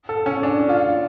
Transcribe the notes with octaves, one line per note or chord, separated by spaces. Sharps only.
A4
C#4
D4
F4